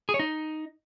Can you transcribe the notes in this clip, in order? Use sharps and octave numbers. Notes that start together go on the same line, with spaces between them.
G#4
C#5
D#4